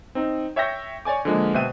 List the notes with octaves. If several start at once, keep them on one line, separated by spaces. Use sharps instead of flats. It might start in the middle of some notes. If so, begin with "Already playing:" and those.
C4 D#4
C#5 E5 G5 C#6 G6 A#6
C#5 D5 G#5 D6
D3 F3 G#3 A#3
B2 C5 E5 G5 F#6 D#7